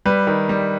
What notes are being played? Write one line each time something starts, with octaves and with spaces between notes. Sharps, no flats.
G3 B4
D#3
G3